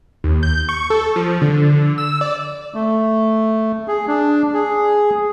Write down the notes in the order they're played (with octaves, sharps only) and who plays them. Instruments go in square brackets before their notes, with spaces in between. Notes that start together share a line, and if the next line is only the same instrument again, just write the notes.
[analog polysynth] D#2
G6
C#6
A4
F3
D3
E6
D5
[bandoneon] A3
G#4
D4
G#4